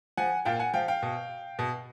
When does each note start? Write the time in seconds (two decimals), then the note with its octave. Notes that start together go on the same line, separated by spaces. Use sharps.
0.17 F3 F#5 G#5
0.45 A#2 F5 G5
0.59 F#5 G#5
0.74 F3 F5 G5
0.88 F5 G5
1.03 B2
1.59 B2